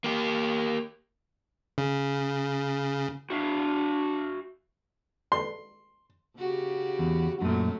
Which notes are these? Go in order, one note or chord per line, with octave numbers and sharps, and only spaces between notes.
A#3 G4
C#3
D4 F#4 E5 F5
C6
C#3 F#4 G4
E2
F#2 A#2 F#3 A3 F#4